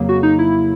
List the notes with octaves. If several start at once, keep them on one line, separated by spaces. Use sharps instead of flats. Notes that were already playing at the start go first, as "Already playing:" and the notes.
Already playing: F2 C#3 F#3 A#3
F#4
D#4
E4